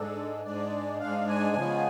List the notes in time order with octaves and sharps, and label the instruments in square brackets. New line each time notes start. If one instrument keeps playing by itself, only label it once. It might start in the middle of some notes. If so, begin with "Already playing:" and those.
Already playing: [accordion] G#2 G#3 D4 A4
G#2 G#3 D4 D5
G#2 G#3 D4 F5
G#5
C#3 F3 G#3 B3